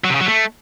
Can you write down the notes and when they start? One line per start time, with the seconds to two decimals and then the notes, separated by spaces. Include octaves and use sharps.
0.04 F#3
0.10 C3
0.15 C#3
0.21 F#3
0.26 A3